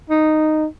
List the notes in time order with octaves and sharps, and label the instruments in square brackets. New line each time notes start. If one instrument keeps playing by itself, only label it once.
[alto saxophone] D#4